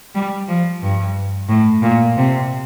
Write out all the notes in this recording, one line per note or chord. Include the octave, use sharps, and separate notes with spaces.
G3
F3
G2
A2
A#2
C3